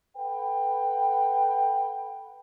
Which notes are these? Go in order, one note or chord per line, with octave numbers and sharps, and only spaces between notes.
A4 B4 F#5 G5